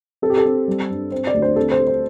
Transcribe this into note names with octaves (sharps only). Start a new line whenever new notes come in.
C4 A4
G4
A4
C4
G3
G2
C4 C5
D5
D2
C5
C4 A4
C5
A3
C5